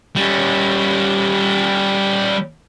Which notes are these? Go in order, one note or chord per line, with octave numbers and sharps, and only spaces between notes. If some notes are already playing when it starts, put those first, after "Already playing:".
G3 C#4